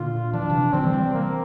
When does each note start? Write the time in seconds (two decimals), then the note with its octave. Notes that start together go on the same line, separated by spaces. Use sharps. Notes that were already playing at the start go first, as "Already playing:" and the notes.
Already playing: A#2 D3 F4
0.33 E3 D4
0.42 F3
0.50 C3 E3
0.73 D3 F3 C4
0.83 E3 G3
0.94 E3 G3
1.14 A#3